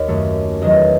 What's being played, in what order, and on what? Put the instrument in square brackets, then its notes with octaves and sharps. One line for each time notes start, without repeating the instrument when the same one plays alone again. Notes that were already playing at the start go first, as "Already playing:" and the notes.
Already playing: [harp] D#2 C#5
F#2 D#3 A3
E2 D#3 F#3 D#5